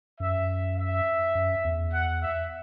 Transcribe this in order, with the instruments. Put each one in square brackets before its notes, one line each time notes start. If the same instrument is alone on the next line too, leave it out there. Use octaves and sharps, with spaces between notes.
[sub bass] F#2 [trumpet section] E5
[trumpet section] E5
[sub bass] F#2
E2
[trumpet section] F#5
E5